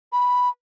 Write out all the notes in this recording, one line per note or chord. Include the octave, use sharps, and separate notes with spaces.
B5